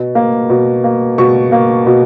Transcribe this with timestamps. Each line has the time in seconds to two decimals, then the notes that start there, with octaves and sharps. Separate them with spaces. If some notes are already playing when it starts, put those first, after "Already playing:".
Already playing: B2
0.15 A#3
0.50 B2
0.84 A#3
1.18 B2 C#6
1.52 A#3
1.86 B2